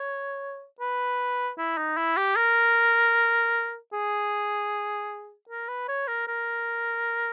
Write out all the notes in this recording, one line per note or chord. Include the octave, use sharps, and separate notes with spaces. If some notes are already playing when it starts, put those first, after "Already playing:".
Already playing: C#5
B4
E4
D#4
E4
G4
A#4
G#4
A#4
B4
C#5
A#4
A#4